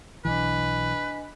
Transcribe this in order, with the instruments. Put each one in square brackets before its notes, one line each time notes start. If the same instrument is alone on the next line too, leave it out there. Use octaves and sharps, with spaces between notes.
[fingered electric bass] B1 E3 [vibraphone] D4 D#5 G#5 [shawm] B4